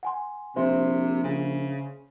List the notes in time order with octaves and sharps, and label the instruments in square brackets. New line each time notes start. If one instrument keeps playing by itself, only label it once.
[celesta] F#5 G#5 C6
[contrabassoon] A#1 [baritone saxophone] C3 [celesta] C5 E5 C6
[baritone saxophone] C#3